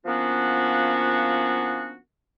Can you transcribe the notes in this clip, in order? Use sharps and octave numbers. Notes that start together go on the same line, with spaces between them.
F3 A#3 B3 C#4 D4 F#4